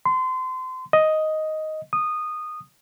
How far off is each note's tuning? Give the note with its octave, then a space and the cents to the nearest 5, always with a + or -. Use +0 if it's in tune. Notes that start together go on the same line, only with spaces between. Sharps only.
C6 -30
D#5 +5
D#6 -15